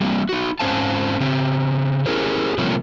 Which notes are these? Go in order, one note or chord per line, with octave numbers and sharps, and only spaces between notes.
G3 A#3 C4
D#4 F#4
G#2 C4 C#4 C5 F5 A5
C#3 C4
C#4 E4 G4 G#4 A#4 C5
C3 F3 G3 A3 A#3 C#4